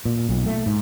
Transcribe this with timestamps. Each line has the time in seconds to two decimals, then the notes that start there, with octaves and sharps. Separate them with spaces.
0.05 A#2
0.29 B1
0.46 A3
0.66 G#2